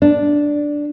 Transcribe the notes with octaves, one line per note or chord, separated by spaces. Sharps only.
D4